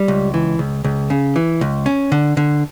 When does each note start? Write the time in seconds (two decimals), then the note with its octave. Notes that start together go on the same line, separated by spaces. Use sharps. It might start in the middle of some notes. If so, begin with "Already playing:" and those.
Already playing: G3
0.08 C#2
0.34 E3
0.59 C#2
0.84 C#2
1.10 C#3
1.36 E3
1.61 C#2
1.86 C#4
2.12 D3
2.37 D3